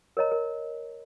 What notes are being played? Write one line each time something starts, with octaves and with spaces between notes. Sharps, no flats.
A#4 C#5 D#5 A#5
A#4